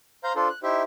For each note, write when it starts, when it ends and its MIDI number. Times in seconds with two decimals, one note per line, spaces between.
0.24 0.33 72
0.24 0.33 77
0.24 0.33 82
0.24 0.33 91
0.36 0.48 62
0.36 0.48 65
0.36 0.48 69
0.36 0.48 72
0.49 0.59 90
0.63 0.83 63
0.63 0.83 64
0.63 0.83 67
0.63 0.83 72
0.63 0.83 76